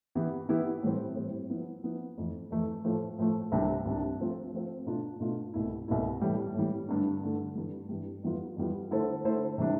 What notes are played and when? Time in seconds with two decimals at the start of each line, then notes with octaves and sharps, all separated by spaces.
0.15 E3 B3 E4 G4
0.49 E3 B3 E4 G4
0.83 A2 E3 G3 C4
1.16 A2 E3 G3 C4
1.50 F3 B3 E4
1.84 F3 B3 E4
2.18 F2 E3 A3 E4
2.51 F2 E3 A3 E4
2.84 A2 F3 A3
3.18 A2 F3 A3
3.52 C2 C3 G3 D4
3.85 C2 C3 G3 D4
4.20 F3 A3 C4 F4
4.53 F3 A3 C4 F4
4.86 B2 A3 D4 F4
5.20 B2 A3 D4 F4
5.54 C2 B2 A3 E4
5.88 C2 B2 A3 E4
6.21 A2 E3 G3
6.54 A2 E3 G3
6.89 G2 D3 A3 D4
7.22 G2 D3 A3 D4
7.55 G2 E3 G3
7.89 G2 E3 G3
8.23 F2 E3 G3 B3 F4
8.57 F2 E3 G3 B3 F4
8.91 D3 A3 E4 A4 C5
9.24 D3 A3 E4 A4 C5
9.58 C3 E3 G3 D4